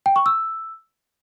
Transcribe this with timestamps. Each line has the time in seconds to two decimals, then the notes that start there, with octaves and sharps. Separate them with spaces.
0.06 G5
0.16 C#6
0.26 E6